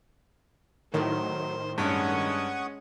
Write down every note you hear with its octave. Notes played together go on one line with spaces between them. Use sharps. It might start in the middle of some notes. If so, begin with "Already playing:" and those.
A2 D#3 F#3 C5
G2 G#3 C#4 F#5 C#6 D#6